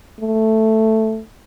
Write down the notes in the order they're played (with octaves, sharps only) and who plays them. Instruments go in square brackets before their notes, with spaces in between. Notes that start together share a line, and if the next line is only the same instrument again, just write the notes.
[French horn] A3